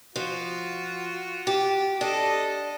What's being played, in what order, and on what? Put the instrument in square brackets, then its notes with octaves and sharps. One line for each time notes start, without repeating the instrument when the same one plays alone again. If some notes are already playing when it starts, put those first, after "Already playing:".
[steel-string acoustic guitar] F3 [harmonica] F4 F#4
[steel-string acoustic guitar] G4
[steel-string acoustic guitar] D4 [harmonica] A4 D#5